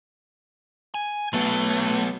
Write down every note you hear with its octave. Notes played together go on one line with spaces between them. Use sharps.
G#5
F#3 A3 B3